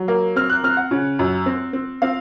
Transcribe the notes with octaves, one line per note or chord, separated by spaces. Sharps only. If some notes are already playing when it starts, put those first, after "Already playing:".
Already playing: F#3
A#3
C4 F6
F#6
C4 F6
F#5
C#3
F#2
C4
C4
C4 F5